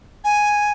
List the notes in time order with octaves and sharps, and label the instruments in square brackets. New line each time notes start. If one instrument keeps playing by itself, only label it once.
[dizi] G#5